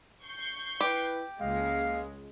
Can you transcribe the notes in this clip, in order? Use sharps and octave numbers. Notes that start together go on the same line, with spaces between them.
C#6 G6 C7
E4 G4 B4
C#2 G#3 A#3 D#5 F5